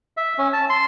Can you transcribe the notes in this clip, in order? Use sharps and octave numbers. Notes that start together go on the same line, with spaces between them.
E5
C#4
A5
C6